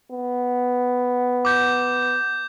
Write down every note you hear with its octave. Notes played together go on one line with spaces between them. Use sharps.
B3
D6 G6